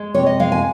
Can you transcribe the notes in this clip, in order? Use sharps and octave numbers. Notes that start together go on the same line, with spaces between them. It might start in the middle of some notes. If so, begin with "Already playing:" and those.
Already playing: G#3
C3 C#5
D#5
G#3 F5
G#5